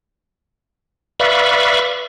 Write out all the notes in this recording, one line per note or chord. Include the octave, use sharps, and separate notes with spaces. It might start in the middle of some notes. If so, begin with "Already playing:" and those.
B4 D5 E5 F5 B5 C#6